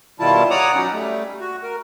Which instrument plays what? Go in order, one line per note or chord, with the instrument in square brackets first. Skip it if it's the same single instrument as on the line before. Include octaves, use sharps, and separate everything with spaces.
[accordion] B2 D#3 G3 E4 F4 A5
C#5 D5 F#5 A#5 D6 D#6
F#3 C#4 D#4
G3 A3
F#4
A#4